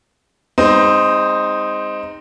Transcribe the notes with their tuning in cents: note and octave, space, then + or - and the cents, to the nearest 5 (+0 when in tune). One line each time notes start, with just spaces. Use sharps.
G#3 -35 C4 +0 D#4 +0